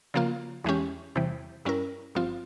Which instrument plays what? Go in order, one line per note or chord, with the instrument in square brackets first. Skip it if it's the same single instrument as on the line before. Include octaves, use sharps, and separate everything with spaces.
[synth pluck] C#3 F3 A#3 F4
E2 E3 G#3 C#4 G4
E2 C3 E3 G3
G2 G3 C#4 E4 A#4
G1 G2 F3 C4 F4